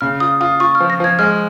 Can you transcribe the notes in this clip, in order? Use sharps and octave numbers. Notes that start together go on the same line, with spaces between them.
C#3 F6
F4 D#6
F4 D#6
F4 C#6
F6
F3
A#6
F3 G#6
G#3 F6